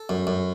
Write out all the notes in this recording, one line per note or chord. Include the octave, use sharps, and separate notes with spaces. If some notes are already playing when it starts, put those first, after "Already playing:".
Already playing: A4
F#2
F#2